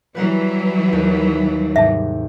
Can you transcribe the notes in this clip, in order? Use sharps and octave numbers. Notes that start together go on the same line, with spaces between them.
E3 F#3 G3 B4 F#5 A#5
D#2
G#2 C3 E5 A5